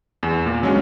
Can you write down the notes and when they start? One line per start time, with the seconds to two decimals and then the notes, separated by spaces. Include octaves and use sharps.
0.23 E2
0.46 A#2
0.62 C#3 F#3 G#3 C#4 D4